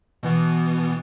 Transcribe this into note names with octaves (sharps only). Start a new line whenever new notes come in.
B2 E3 B3